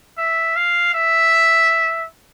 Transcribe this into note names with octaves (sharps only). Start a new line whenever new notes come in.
E5
F5
E5